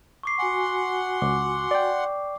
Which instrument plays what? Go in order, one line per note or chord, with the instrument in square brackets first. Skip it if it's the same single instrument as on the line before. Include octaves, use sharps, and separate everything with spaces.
[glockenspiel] C#6 D6 C7
[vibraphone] F#4 G#5 [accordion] F#5 C6
[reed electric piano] C#2 [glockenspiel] D6
[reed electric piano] D5 G5